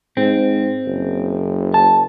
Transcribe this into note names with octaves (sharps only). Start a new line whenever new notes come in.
G#2 C4
F#1
A5